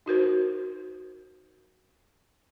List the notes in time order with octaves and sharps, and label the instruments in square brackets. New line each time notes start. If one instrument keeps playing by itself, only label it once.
[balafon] D#4 F#4 A#4 C5